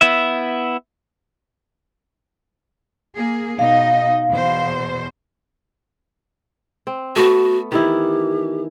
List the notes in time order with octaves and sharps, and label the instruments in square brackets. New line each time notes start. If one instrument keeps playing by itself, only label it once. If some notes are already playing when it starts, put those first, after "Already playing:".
[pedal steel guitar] B3 E4 E5
[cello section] A#3 G#4
[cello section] B2 D#4 D#5 [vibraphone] F5
[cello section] E2 B2 C5
[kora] C4
[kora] A3 B3 [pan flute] F#4
[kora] D#3 E3 E4 [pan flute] G4